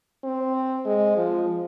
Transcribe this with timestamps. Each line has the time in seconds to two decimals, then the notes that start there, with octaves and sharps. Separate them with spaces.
0.24 C4
0.85 G#3
1.17 F3